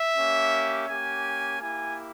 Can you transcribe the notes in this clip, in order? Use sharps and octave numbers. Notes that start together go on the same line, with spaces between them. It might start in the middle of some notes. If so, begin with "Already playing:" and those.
Already playing: E5
A#3 C#4 G4
A#3 C#4 G4 G#5
A#3 E4 G4 G#5